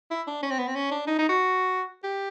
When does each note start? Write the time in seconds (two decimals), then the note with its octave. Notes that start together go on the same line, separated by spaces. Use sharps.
0.11 E4
0.27 D4
0.43 C#4
0.51 C4
0.59 B3
0.68 C4
0.75 C#4
0.91 D4
1.07 D#4
1.19 D#4
1.29 F#4
2.04 G4